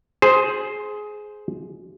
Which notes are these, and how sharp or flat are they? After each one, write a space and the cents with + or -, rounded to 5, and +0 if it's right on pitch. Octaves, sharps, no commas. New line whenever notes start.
G#4 +15 C5 +0